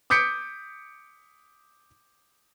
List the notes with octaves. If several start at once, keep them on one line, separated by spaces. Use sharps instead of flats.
D6 D#6 G6 B6 C#7 D7